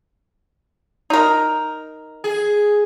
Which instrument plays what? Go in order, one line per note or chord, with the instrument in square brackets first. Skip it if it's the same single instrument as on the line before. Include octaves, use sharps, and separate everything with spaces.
[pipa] D#4 A#4
[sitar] G#4